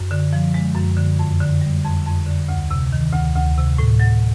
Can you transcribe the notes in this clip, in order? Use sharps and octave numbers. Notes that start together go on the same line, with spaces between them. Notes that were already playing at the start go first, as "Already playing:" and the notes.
Already playing: F#2
D3
F3
G#3
F#2
D3
F2
D3
G3
F2
F2
D3
D2
C3
D#3
D2
D2
C3
A2
F#3